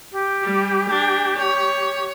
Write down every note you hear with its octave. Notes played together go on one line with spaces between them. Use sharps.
G4
G3
D4
C#5